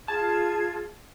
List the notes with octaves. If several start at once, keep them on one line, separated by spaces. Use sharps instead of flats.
F4 G#4 A5 G#6